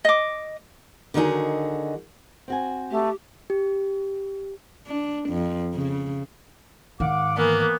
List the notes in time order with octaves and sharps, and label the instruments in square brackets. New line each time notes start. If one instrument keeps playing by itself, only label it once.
[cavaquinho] D#5 D6
[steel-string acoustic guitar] D3 D#3 F#3 D#4 F#4 G#4
[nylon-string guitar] C4 F#4 G#5
[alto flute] A3 [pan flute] G4
[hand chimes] G4
[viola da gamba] D4
F2
C#3
[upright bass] G#2 D#3 [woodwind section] F5 F#5 D6
[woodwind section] E3 B3 [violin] A#3